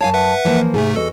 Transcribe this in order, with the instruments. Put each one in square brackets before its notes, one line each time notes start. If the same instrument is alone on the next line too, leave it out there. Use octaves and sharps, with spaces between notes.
[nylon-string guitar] F#2 A5 [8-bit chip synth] C#5 F5 G#5
[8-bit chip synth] B4 E5 F#5
[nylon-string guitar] E3 F3 A#3
[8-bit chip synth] G#2 C3 A3 [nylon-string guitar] G#4 G#5
[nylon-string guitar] E2 F#4 D#5 [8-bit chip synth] A4